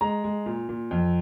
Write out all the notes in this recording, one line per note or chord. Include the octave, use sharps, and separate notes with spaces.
G#3 A#5
G#3
A#2
A#2
F2